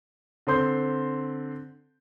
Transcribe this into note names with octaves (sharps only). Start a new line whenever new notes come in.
D3 C4 C6 G6